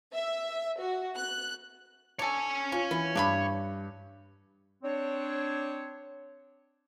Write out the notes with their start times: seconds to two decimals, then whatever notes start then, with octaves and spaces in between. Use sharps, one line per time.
0.13 E5
0.79 F#4
1.17 F#6
2.19 D4 A4 C#5 G#5
2.72 C#4 F4
2.91 E3 B3
3.15 G2 D4 F#4 B5 D6
4.83 C4 D4 C#5